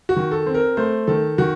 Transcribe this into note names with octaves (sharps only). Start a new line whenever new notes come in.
F#4
D#3
A4
C4
A#4
A3 C5
D#3 A4
D#3 F#4